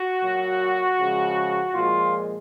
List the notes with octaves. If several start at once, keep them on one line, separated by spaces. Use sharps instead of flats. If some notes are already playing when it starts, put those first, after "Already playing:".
Already playing: F#4
A#2 F#3
C#3 F3 G#3
A#2 F3 G#3 F4